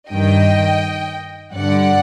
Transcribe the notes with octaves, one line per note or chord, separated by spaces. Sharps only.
G2 D#3 D#5 G5
G2 D3 D5 F#5